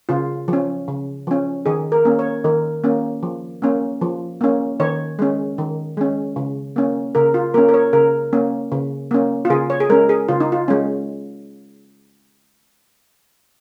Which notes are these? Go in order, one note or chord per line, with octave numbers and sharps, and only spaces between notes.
C#3 F4
F3
C#4
C#3
F3 C#4
D#3 G#4
A#4
A#3 C#4
C#5
D#3 A#4
A#3 C#4
F3
A#3 C#4
F3
A#3 C#4
D#3 C#5
G#3 C#4
D#3
G#3 C#4
C#3
A#3 C#4
C#3 A#4
F4
A#3 C#4 A#4
A#4
C#5
C#3 A#4
A#3 C#4
C#3
A#3 C#4
F4
C#3 G#4
C#5
G#4
G#3 C#4 A#4
G#4
C#3 F4
D#4
F4
G#3 C#4